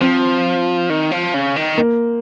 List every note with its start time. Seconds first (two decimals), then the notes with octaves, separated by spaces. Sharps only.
0.01 F3 C4
0.90 D#3
1.11 F3
1.34 C#3
1.56 D#3
1.78 A#3